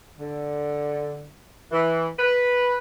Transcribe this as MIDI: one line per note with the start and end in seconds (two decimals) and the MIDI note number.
0.19 1.27 50
1.72 2.05 52
2.19 2.78 71